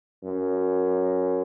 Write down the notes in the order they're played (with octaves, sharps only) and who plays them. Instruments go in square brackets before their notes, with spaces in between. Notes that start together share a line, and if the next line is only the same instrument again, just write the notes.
[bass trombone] F#2